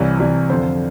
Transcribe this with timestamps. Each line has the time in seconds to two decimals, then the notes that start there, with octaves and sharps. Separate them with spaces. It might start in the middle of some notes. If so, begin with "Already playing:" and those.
Already playing: C2 C3 E3 C#5
0.19 C2 C3 E3
0.50 F2 D3 C5